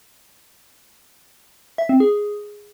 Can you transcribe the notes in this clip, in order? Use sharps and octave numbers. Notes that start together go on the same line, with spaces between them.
E5
C4
G#4